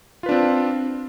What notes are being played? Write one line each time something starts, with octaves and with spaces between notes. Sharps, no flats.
C4 D4 F4 B4